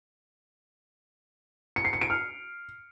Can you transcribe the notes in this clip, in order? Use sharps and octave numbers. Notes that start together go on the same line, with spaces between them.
C#7
C7
C#7
D7
F6